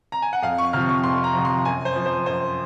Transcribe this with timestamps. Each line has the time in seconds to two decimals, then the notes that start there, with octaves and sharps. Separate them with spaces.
0.12 A#5
0.22 G#5
0.33 F#5
0.42 F2 F5
0.58 C#6
0.73 C3 F3 F6
0.89 C#6
1.04 F2 C6
1.24 A#5
1.34 C3 F3
1.45 C6
1.65 F#2 G#5
1.85 C5
1.95 F3
2.06 C5
2.26 F#2 C5